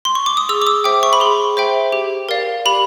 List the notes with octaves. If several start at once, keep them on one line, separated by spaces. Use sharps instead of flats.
C6
C#6
D6
D#6
G#4 E6
D6
D#6
C5 E5 G5 D6
C#6
B5
G#4 C6
C5 E5 G5
G4
A#4 D5 F5
G4 B5